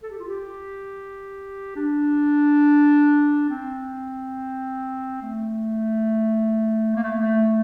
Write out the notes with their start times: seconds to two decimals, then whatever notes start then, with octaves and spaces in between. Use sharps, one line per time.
0.03 A4
0.11 G4
0.19 F4
0.28 G4
1.76 D4
3.50 C4
5.22 A3
6.96 A#3
7.03 A3
7.18 A3